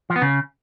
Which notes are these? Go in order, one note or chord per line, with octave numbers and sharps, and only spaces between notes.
F3
B3
C#3